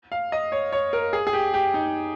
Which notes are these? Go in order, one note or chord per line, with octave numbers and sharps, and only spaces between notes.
F5
D#5
C#5
C#5
A#4
G#4
G#4
G4
G4
D#4